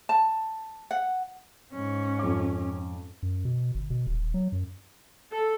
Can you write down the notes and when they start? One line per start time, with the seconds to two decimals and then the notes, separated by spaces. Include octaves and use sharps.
0.09 A5
0.91 F#5
1.72 G#2 C#4
2.19 F2 D6
3.23 F#2
3.45 B2
3.75 G1
3.90 B2
4.07 D#1
4.34 F#3
4.52 F#2
5.32 A4